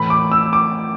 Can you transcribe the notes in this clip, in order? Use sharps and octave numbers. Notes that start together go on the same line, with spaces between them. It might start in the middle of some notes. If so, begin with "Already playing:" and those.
Already playing: A2 E3 B5
D6
E6
D6